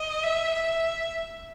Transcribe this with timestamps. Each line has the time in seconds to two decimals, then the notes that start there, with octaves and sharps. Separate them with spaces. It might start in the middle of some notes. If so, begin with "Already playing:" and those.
Already playing: D#5
0.23 E5
0.53 E5